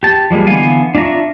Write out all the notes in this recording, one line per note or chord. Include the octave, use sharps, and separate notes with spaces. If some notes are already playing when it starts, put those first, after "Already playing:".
G4 A5
F3 G3 G#3 A#3
D3 E3 B3 F5 G#5
D4 F4 E5 A#5 C#6